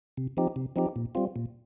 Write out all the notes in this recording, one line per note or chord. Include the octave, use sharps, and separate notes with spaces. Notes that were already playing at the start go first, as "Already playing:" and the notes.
C3
F3 C4 D#4 G4
C3
F3 C4 D#4 G4
A#2
G3 C4 F4
A#2